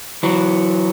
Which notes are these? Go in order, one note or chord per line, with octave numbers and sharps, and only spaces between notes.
E3 F#3